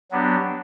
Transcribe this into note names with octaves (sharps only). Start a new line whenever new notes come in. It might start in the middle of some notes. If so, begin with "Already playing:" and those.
F#3 B3 D4 G4